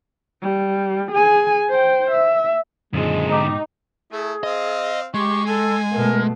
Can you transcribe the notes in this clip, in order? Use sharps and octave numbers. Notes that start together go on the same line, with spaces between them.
G3
G#4 G#5
C5 G5
E5
F#2 A#2 D3 D#3 G#3 C4
G#2 B2 D#4 G4
A3 E4 G#4
C4 D#5 F5
G#3 G4 C#6
A4 G#5
B2 A3 A#4